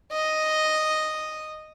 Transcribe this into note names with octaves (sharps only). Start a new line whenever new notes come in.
D#5